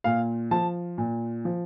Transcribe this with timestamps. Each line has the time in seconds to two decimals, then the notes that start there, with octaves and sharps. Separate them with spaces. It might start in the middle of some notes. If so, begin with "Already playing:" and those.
0.04 A#2 F5
0.51 F3 A5
0.98 A#2
1.45 F3